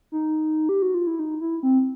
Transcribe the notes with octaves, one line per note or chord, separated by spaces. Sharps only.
D#4
G4
F#4
F4
E4
D#4
E4
C4